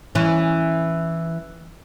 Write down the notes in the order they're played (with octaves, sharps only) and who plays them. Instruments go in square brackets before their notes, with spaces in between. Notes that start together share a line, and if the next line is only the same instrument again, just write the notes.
[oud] E3 C#4